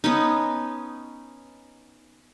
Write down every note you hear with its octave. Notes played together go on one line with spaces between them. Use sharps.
B3 C#4 D#4